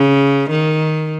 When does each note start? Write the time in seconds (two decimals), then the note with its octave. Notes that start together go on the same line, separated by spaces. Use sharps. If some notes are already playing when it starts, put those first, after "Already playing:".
Already playing: C#3
0.50 D#3